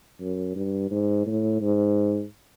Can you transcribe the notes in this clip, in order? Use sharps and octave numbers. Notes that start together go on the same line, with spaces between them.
F#2
G2
G#2
A2
G#2